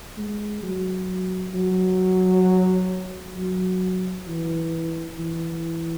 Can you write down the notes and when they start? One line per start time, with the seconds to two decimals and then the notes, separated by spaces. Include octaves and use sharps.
0.17 G#3
0.63 F#3
1.54 F#3
3.36 F#3
4.27 E3
5.19 E3